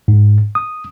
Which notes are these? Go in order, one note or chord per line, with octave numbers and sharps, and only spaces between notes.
G#2
D#6